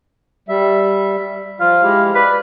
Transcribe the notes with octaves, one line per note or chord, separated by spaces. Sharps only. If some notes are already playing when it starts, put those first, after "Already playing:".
G3 E5
F3 F4 F5
G#3 E4 G4
B4 D5